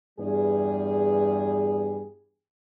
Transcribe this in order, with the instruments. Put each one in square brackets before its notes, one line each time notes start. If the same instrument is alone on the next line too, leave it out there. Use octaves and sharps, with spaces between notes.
[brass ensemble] E2 G2 G3 G#4